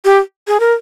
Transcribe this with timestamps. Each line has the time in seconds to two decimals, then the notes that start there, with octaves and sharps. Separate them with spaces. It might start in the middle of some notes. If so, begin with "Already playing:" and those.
0.05 G4
0.48 G#4
0.60 A#4